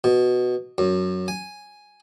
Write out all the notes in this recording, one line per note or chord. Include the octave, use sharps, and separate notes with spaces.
B2
F#2
G#5